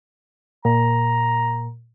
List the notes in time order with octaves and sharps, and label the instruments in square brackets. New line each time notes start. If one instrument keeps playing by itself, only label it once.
[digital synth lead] A#2 [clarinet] A#5